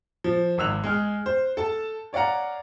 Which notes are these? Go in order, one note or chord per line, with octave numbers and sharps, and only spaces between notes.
F3
G#1 G#2 E6 F#6 F7
G#3 G#4 F6
C5
A4 A5
C#5 D5 F5 F#5 A#5